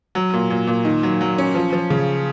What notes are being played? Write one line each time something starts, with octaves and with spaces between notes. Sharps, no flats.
F#3
A#2
A#2
A#2
D#3
F#3
F#3
C#4
F3
F3
C#3